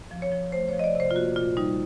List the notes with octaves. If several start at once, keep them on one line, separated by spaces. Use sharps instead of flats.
F3
C#5
F3
A3 C5
F3 C#5
D#5
D5
C3 C5
F4
A#3 F#4
A#2 F4
G3 D#4